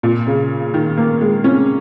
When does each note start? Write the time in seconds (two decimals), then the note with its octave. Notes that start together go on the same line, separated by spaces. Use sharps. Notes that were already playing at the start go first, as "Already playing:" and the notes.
0.03 A#2
0.27 C#3
0.74 D#3
0.98 A#3
1.21 G#3
1.44 C#4